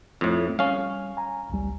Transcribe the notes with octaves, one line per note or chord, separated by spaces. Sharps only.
F2 A2
G3 C#4 F5
G#5 A#5
A1 D2 G3